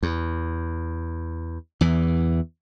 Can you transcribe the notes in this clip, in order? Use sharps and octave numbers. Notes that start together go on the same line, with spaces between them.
E2
E2 E3